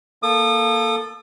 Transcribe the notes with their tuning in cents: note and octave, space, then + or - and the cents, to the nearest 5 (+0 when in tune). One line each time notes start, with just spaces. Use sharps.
A#3 +0 A4 +0 D#6 -35